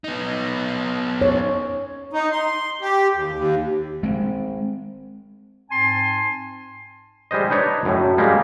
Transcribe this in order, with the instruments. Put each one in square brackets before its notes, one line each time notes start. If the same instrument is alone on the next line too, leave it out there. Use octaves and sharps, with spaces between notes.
[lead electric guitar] B3 D#4
[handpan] C#5
[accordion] D#4
C6
G4
D#2
D#2
[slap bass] G#3 C4
[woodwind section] G#2 C4 G#5 A5 C6
[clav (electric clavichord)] G3 G#3 C5 D#5
D4 D#4 B4 C#5 D5
F#2 A2
G3 G#3 A#3